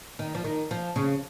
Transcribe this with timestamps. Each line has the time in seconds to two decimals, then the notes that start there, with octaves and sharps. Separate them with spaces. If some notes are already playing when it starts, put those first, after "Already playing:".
0.19 D#3
0.35 F3
0.44 D#3
0.71 F3
0.96 C#3